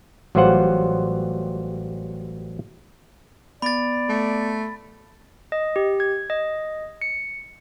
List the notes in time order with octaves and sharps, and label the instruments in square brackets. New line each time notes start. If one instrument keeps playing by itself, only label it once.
[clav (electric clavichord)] A1 F#3 G3 F4 C5 F#5
[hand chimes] B3 [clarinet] D5 [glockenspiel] B5 A6
[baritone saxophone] A3
[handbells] D#5
G4
G#6
D#5
C#7